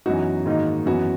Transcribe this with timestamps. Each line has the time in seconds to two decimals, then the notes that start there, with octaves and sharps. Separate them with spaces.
0.06 F#2 E3 B3 D#4 F#4
0.46 G#2 D#3 A#3 D#4
0.86 F#2 E3 B3 F#4